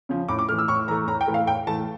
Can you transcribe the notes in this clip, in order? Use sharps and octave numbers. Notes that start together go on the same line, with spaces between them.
C#3 F3
A2 D6
D6
E3 A3 F6
E6
A2 C#6
E3 A3 A#5
A2 A#5
G5
E3 A3
F5
A2 G5
E3 A3 A5